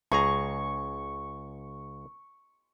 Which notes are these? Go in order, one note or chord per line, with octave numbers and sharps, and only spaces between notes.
C#2 G#4 A#5 C#6